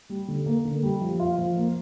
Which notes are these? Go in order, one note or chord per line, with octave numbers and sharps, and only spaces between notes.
G3
D3
A#3
D3
G3
F3
F4
F3
A#3